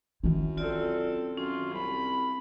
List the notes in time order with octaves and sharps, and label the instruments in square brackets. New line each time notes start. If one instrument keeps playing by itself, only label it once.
[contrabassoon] F#2 [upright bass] D#3 E4
[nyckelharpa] C4 A4 [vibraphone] F4 D5
[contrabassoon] F#2 [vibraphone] C#4 [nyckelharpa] F4
[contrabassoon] C2 [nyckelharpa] B5